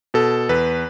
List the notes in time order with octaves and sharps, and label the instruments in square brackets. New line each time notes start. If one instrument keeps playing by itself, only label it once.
[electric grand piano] B2 A4
E2 B4